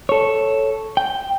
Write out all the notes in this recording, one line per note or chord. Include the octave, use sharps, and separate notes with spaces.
A4 C#5
G5